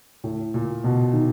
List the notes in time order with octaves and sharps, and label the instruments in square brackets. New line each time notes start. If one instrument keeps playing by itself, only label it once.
[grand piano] A2
A#2
B2
D#3